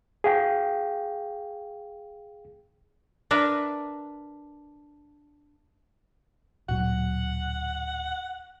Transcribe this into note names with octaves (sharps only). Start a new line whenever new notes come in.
G#4 F5 G5
D4 A#4 B4 E5
D1 A#2 F#3 F#5